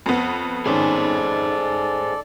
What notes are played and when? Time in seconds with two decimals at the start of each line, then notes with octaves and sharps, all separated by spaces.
0.06 F2 B3
0.66 G#2 D#3 C#4 G#4 A4 C5 D5